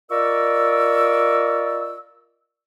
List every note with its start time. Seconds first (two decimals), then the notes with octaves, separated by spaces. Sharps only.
0.10 F4 A#4 D5 D#5 C#6 E6